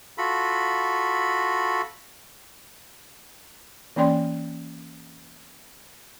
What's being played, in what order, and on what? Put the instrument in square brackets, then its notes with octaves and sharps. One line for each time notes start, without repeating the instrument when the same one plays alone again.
[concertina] F4 F#4 A4 B5
[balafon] E3 A#3 C#4 D5 G5 C6